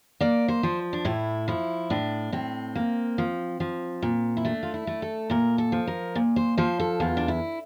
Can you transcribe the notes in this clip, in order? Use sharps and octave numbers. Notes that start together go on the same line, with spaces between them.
A#3 D5
C5
F3
D4
A2 E4
F3 E4
A2 D4
A2 C4
A#3
F3
F3
A#2
E4
A3 D4
F4
E4
A3
A4
A#2 A#4
A4
F3
A#4
A#2
C5
F3 C5
A4
E2 F4
D4
E4